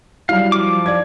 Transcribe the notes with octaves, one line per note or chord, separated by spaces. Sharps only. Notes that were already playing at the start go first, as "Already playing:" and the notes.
F#3 G3 E4 F5
F3 D6
D5 G#6